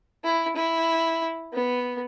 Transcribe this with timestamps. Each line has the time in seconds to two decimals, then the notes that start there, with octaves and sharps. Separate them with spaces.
0.24 E4
0.57 E4
1.53 B3